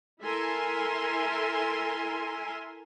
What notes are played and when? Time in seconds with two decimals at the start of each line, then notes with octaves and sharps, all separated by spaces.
0.22 E4 A4 A#4 E5 G#5 C6